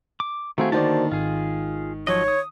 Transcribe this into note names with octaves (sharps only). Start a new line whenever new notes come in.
D6
D#3 A3 C4 F#4 G#4 C5 F5
D3 D#3 A#3 F#4 C5 D5 A5
G#1 F4 G#4
F3 F#3 C#5 D#5
D#6